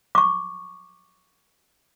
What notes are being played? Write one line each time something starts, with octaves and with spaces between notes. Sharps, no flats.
C#6 D6